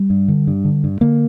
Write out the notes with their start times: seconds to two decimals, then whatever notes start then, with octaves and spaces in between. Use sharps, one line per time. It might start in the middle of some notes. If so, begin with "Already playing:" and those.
Already playing: G3
0.10 G2
0.28 D3
0.47 G2
0.64 D3
0.84 G2
1.01 D3 A#3